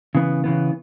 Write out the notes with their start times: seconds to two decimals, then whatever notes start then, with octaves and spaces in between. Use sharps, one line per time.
0.15 C#3 E3 B3
0.44 C#3 E3 B3